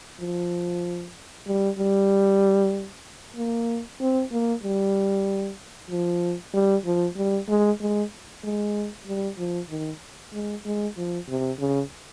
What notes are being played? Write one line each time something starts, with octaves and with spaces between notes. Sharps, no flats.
F3
G3
G3
A#3
C4
A#3
G3
F3
G3
F3
G3
G#3
G#3
G#3
G3
F3
D#3
G#3
G#3
F3
C3
C#3